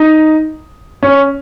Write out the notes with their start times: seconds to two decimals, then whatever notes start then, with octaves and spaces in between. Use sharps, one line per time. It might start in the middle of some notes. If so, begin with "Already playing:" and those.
Already playing: D#4
1.03 C#4